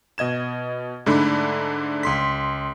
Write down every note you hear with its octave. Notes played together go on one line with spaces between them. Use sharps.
B2 D#5 G#6 E7
G#2 D3 A3 D4 B5
C#2 C6 B6